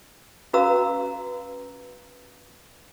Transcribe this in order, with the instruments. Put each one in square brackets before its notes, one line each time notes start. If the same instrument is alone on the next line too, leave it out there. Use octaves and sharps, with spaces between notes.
[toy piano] C#4 F#4 B4 F5 A#5 E6